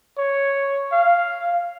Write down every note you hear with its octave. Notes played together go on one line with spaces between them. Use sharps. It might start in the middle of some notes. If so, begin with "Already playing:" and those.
C#5
F5